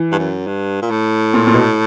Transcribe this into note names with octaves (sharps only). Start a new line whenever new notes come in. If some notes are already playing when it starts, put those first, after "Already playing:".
Already playing: E3
G2
F#2
G2
A#2
A2
A#2
A#2
B2